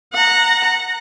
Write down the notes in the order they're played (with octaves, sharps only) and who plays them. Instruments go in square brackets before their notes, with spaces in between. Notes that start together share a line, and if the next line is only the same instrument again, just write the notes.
[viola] F#5 A#5